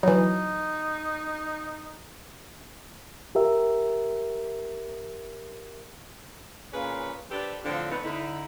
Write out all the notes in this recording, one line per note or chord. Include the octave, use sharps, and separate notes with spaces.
E3 F#3 D#4
G4 A#4 E5
A#2 C#4 G#4 B4 C#5 F5
D4 G4 A4 B4 C5
A2 D3 F3 C4 D4 F4
A3 B3 C4 D#4
D3 D#4 E4